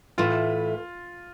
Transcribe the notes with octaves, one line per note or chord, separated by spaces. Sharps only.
A2 E3 A3 E4 F4